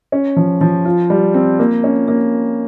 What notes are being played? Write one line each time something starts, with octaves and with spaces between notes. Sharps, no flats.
C#4
F3
F3
F4
G3
C4
A#3
C#4
A#3